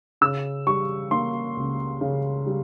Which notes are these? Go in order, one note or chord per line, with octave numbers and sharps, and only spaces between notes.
C#3 E6
G3 C#6
A#3 C6
C#2
C#3
G3